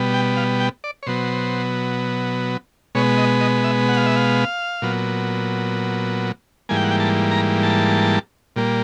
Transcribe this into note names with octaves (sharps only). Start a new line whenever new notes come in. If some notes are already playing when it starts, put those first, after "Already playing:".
Already playing: B2 G3 B3
G5
F5
G5
D5
C#5
B2 F#3 B3 C5
B2 G#3 B3 C#5
D#5
D#5
E5
F#5
F5
E5
F5
A#2 F#3 B3
G#2 E3 G3 A#3 G#5
G5
F#5
G5
A5
A#5
A5
A#2 G3 A#3